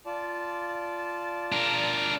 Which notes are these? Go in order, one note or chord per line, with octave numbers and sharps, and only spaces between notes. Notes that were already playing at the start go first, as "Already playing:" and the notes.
F4 D5 A5
D4 A#4